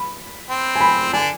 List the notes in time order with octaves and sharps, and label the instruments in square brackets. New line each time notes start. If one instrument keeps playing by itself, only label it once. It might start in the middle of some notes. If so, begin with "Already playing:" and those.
Already playing: [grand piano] B5
[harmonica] C4
[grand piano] G#5
B5
[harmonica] D3 D4 [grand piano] G#5